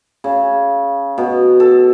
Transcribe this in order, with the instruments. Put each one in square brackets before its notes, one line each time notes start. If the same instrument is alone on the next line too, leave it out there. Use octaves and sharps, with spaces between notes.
[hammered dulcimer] C#3
B2
A4